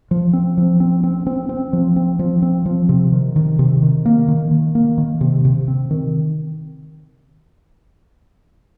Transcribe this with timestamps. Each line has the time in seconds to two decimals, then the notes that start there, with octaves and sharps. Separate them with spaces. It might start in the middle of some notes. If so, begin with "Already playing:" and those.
0.11 F3
0.33 C4
0.57 F3
0.80 C4
1.04 C4
1.27 C4
1.49 C4
1.73 F3
1.96 C4
2.19 F3
2.42 C4
2.66 F3
2.89 C3
3.12 D#3
3.36 D#3
3.59 C3
3.83 D#3
4.05 A#3
4.28 D#3
4.51 D#3
4.75 A#3
4.98 D#3
5.21 C3
5.45 C3
5.68 C4
5.91 D#3